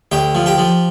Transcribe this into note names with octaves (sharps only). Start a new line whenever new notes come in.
D2 G4 G5
F3
G4 G5
F3